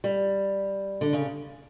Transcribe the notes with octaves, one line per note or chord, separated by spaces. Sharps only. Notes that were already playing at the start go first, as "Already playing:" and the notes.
G3
D3
C#3